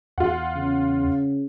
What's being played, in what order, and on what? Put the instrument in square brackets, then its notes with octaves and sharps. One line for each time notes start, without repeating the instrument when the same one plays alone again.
[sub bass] E2 [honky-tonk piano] F4 F#5
[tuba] C#3